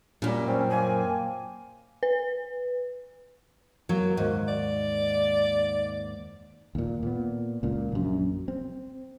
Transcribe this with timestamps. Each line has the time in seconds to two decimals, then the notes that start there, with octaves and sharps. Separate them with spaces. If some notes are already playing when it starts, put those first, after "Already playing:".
0.22 F#2 A#2 G3
0.48 C4 C#4
0.70 A#3 G#5
2.03 B4
3.89 F#3 A#3
4.17 D#2 G#2
4.48 D5
6.75 D#2 A#2
7.03 A#2 B3
7.63 C#2 A#2
7.92 A#1 F#2
8.48 C4